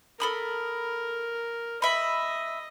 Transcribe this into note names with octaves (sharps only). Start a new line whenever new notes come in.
A4 A#4 B5 D#6
D#5 E5 B5